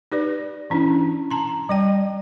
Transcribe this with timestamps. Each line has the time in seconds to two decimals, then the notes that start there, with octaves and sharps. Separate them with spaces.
0.12 D#4 G4 B4 D5
0.70 E3 C#4 D4 E4
1.31 A5 A#5 C6
1.69 G3 D5 G5